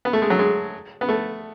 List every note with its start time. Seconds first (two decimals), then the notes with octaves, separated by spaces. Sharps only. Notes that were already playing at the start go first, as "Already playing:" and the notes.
0.05 B3
0.13 A3
0.22 G#3
0.30 F#3
0.39 G#3
1.01 B3
1.09 A3